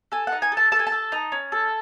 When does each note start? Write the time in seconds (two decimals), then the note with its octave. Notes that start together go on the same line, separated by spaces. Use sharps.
0.12 A4 G#5
0.27 F#5
0.32 D#4
0.42 G#5
0.52 A4
0.57 A5
0.72 A4 A5
0.79 G#5
0.87 A5
0.92 A4
1.12 D#4
1.32 C#4
1.52 A4